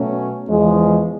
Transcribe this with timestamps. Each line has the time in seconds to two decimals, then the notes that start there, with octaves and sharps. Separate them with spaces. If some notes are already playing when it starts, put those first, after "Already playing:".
Already playing: B2 F#3 A3 C#4
0.47 E2 C#3 F3 G#3